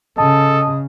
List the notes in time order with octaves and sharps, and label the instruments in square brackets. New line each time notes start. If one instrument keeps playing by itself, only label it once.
[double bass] C#3 [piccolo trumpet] A4 [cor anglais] D#5 [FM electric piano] A5